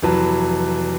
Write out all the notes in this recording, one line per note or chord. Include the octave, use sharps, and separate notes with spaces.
F1 E3 F#3 B4 A5